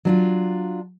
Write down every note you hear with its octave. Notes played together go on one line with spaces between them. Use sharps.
F#3 D4 F4